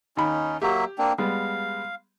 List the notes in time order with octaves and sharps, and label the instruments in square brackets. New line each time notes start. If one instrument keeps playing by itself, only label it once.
[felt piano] D#2 B5 [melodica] C#4 D#4
[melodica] F#3 A#3 E5 [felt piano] G4
[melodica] A#3 C4 D4
[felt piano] G3 G#3 B3 [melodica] F5